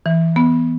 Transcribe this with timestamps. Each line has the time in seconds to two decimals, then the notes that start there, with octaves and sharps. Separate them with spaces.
0.06 E3
0.36 B3